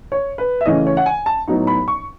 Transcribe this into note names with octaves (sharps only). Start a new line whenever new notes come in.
C#5
B4
E5
C#3 E3 A3 C#4 D#5
C#5
F#5
G#5
A5
A2 F#3 B3 D#4
B5
C#6